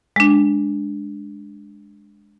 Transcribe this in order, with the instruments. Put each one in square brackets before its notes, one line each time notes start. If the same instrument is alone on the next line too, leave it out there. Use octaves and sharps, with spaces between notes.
[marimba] G#3 D4